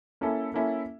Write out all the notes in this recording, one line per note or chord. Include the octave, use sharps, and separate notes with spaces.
A#3 C#4 E4 A4
A#3 C#4 E4 A4